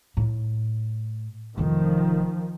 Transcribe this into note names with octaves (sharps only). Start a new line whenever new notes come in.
A2
F1 D#3 F3 A3